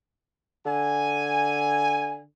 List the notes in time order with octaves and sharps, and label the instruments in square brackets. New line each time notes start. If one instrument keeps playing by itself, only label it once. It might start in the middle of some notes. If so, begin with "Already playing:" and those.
[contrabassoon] D3 [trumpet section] G#5